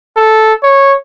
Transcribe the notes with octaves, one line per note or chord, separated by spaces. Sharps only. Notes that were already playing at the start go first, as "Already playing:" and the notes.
A4
C#5